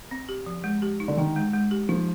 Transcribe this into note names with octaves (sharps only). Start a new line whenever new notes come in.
C4
G4
F3
G#3
G4
D#4
D3
D#3 D#4
G#3
G#3
G4
F3 D#4